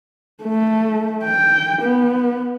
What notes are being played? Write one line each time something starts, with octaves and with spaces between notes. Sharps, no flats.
A3
G5
B3